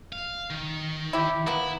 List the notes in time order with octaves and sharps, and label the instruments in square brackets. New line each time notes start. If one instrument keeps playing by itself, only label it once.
[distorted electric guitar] F5
D#3
[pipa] E4 G4
[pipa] A#3 B3 [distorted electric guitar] E4